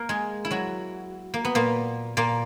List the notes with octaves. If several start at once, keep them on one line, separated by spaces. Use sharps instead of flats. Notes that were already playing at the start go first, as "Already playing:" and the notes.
Already playing: A#3 A#4
G#3 G#4
E4
F#3 F#4
A#3
B3
A#2 A#3
A#2 A#3